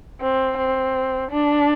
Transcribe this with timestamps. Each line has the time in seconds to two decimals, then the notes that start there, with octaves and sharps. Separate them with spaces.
0.21 C4
0.58 C4
1.31 D4